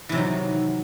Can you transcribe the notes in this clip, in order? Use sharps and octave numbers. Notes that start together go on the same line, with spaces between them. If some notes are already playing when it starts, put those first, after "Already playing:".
C3 D#3 E3 F#3